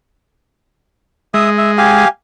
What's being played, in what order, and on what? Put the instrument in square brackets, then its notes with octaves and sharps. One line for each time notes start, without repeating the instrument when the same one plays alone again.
[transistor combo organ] G#3 [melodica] E5 D#6
[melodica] E5
G4 F5 G#5